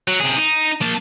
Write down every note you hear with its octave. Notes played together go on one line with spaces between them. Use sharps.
F#3
C3 G#4
D#4
A#3 A5